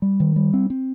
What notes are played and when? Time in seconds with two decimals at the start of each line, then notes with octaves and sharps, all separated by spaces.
0.02 G3
0.20 D#3
0.36 G3
0.53 C4
0.70 C4